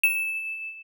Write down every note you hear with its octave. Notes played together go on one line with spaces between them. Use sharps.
E7